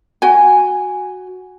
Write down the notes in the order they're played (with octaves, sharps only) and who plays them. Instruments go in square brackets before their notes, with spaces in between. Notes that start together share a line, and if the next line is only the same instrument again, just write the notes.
[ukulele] F#4 G#5